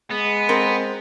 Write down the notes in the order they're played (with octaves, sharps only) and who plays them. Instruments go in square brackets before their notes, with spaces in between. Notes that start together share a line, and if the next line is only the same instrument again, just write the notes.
[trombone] G#3 [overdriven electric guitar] B3
[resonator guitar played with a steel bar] C4 A#4